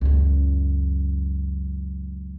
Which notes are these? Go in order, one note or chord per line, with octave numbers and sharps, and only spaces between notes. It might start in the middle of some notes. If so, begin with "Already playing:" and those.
C#2 F#2